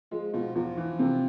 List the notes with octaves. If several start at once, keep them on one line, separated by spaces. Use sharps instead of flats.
F3 G#3
B2 F3
E2 F3
E3
C3